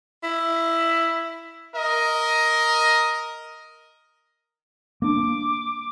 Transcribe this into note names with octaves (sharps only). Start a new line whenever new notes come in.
E4
A#4 D#5
A#3 D4 D6